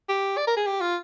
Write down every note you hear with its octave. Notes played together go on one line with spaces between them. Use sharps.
G4
D5
A#4
G#4
G4
F4